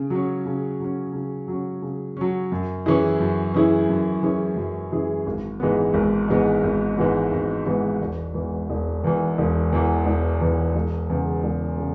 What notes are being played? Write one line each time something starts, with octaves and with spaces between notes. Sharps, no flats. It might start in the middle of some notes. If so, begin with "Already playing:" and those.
Already playing: C#3
F#3 C#4
C#3
F#3 C#4
C#3
F#3 C#4
C#3
F#3 C#4
F#2
E3 C#4 E4 G#4
F#2
E3 C#4 E4 G#4
F#2
E3 C#4 E4 G#4
F#2
E3 C#4 E4 G#4
G#1
G#2 E3 G#3 B3
G#1
G#2 E3 G#3 B3
G#1
G#2 E3 G#3 B3
G#1
G#2 E3 G#3 B3
E1
E2 E3
E1
E2 E3
E1
E2 E3
E1
E2 E3
E1
E2 C#3
E1
C#3